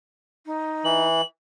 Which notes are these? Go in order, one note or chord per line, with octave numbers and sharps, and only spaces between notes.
D#4
E3 F#7